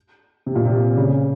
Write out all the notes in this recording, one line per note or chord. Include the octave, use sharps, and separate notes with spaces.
C3
A#2
C3
C#3